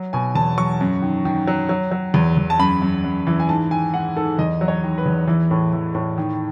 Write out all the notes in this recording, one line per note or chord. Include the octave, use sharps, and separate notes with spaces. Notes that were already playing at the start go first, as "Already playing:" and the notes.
Already playing: F#3
B2 G#5
E2 A5
F#3 C#6
F#2
D#3
D#3
F#3
F#3
F#3
E2
E2
A5
F#2 B5
F#2
F#2
E3
G#5
G#2 A5
D#3 G#5
G#2 F#5
G#2 A4
E2 D#5
F#3
C#5
D#3
B4
E2
E3
A2
E3
A2
D#3